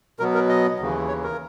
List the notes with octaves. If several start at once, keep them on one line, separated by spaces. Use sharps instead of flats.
B2 F#3 B3 A#4
A#4
D#5
D#2 C#3 E3
C#5
A#4